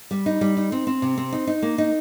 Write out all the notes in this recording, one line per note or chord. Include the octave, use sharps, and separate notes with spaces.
G3
D#4
G3
D#4
C4
C4
C3
C4
D#4
D#4
A#3
D#4